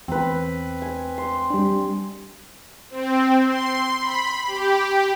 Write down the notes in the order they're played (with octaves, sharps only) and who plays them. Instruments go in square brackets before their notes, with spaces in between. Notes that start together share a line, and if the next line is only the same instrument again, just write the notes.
[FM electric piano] E2 [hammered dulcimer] C4 B4
[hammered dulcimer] G#5
C6
[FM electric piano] G3 D4
[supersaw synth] C4
C6
B5
G4